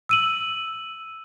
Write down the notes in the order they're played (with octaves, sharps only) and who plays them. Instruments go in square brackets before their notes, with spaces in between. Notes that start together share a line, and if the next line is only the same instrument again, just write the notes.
[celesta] E6 D#7 F#7